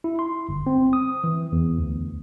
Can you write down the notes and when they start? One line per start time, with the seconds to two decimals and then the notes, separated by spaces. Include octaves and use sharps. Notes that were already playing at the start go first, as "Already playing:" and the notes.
0.04 E4
0.19 C6
0.49 G1
0.67 C4
0.93 D#6
1.24 E3
1.52 E2
1.79 D2